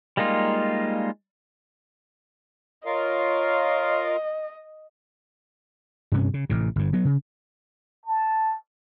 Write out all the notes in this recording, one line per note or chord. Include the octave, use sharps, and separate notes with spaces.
G3 G#3 A#3 D#4 F4
F4 A#4 C#5 D#5 F5
G2 C3 C#4
C#3
A1 A2 C3
G1 G2
F#3 B3
C#3
A5